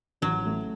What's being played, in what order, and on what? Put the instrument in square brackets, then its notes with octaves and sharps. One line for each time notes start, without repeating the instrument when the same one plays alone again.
[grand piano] A1 [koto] F#3
[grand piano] A3